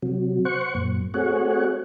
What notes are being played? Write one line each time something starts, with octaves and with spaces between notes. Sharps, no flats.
C3 F#3
C5 F#5 C#6
F#2 A#2
A3 C4 F#4 G#4 C#5 F#5